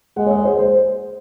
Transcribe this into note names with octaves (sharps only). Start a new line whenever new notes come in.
G#3 F#5
C#5
D#5
C5
C5